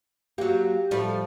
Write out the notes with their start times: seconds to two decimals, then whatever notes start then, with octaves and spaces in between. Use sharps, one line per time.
0.38 F#3 A#3 G4
0.91 A2 F3 G3